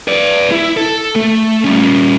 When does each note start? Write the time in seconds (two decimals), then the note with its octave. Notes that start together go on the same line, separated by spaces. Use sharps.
0.08 B4 D5
0.52 E4
0.77 A4
1.16 A3
1.64 G3 C#4